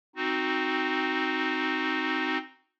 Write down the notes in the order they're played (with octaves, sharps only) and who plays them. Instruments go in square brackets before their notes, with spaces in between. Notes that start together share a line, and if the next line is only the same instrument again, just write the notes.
[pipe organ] C4 D#4 F#4